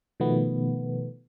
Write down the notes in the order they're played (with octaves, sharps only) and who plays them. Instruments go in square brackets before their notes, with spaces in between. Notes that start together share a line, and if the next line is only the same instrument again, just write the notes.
[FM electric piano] B2 D#3 F3 A3 B3